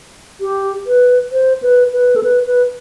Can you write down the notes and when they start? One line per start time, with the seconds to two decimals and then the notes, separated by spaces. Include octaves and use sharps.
0.41 G4
0.87 B4
1.32 C5
1.62 B4
1.93 B4
2.16 A4
2.24 B4
2.46 B4